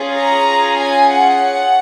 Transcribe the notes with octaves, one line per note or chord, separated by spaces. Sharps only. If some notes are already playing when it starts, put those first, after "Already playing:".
Already playing: C#4 F4 G#4
A#5
G#5
F#5